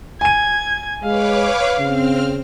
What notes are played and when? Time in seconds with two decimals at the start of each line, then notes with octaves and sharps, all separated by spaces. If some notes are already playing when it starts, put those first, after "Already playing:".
0.21 G#5 G#6 D#7
1.04 G#3 B4 C#5 F5 D6
1.79 C#3 C4 F6